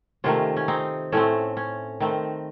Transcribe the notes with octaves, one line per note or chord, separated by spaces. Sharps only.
C3 D#3 A3 C#4 F4
C#4
C4 D#4
A2 A3 C4 C#4
C#4
D#3 A3 C4